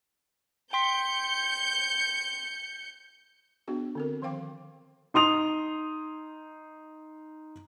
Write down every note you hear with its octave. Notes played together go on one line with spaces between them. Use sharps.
G5 C6 G6 B6 C#7
B3 D4 F#4 G#4
D3 C4 A#4
D#3 F3 C5 F5 G5 D6
D#4 C6 D#6 F7